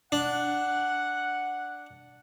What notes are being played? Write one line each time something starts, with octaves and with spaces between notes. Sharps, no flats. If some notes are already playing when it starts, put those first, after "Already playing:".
D4 F#5